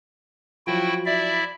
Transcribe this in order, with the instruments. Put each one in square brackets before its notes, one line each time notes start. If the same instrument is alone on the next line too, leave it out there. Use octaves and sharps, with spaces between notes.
[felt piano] F3 F#3 [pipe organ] E4 F#4 G5
[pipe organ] E4 D5 E5